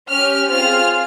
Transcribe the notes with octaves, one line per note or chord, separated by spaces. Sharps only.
C#4 G4 F6
C4 F4 G#4 F6